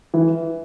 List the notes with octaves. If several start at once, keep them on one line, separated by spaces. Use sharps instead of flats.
E3